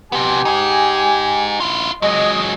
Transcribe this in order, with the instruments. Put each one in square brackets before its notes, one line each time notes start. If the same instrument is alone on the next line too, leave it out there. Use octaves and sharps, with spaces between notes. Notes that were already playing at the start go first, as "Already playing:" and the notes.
[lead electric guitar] C3 B3 [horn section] G4 G#5
[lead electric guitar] D#4 G#4
E4 F4
[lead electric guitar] F#3 G#3 [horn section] D#5